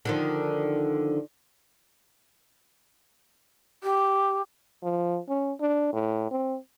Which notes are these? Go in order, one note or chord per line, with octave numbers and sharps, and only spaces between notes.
D3 D#3 F3
G4
F3
C#4
D4
A2
C4